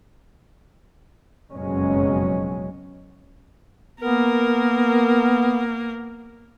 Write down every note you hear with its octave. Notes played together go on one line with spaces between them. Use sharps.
F#1 F2 B2 F#3 G#3 C#4
A#3 B3 A#4